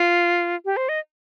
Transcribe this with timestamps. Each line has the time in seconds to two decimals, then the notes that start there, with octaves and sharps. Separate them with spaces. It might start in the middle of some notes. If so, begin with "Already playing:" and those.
Already playing: F4
0.65 G4
0.77 C5
0.89 D#5